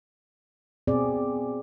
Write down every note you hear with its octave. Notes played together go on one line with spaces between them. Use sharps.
B2 C4 G#4 D5